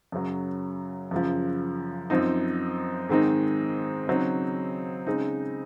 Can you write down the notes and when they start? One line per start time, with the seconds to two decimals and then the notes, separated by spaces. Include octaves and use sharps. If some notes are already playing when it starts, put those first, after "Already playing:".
0.12 F#2 C#3 F#3
1.11 F#2 C#3 F3
2.10 F#2 F3 C4 D#4
3.09 G#2 D#3 G#3 C4 D#4
4.07 C#3 F#3 C4 D#4
5.07 C#3 G#3 C4 D#4